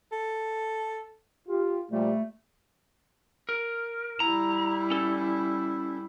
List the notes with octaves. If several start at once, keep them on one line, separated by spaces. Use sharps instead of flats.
A4
F4 G4
A#2 F3 G3 A3
A#4
G3 E4 A#5
C#4 A4